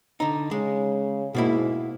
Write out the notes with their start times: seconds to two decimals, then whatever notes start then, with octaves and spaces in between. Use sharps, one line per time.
0.20 D3 D#4
0.51 C#3 G#3
1.35 G#2 B2 A#3 E4